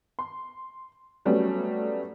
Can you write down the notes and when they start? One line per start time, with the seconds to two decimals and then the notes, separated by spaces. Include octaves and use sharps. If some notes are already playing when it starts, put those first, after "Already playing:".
0.19 C6
1.25 F#3 G3 A3 B3 C#4